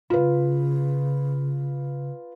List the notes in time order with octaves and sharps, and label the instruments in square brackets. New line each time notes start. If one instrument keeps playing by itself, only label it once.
[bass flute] C#3 [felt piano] F4 B4